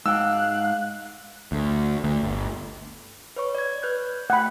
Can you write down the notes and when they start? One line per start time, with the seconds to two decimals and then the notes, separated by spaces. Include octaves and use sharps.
0.06 G#2 F5 G5 E6 F#6
1.52 D2
2.04 D2
2.23 G1
3.36 B4 C#5 C#6
3.55 D5 G#6
3.83 B4 F#6 G6
4.30 A3 F#5 G5 B5 F#6